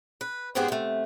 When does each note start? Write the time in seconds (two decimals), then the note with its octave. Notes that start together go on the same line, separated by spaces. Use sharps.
0.21 B4
0.55 G#2 G#3 B3 G4 G#4 C5
0.68 C3 A3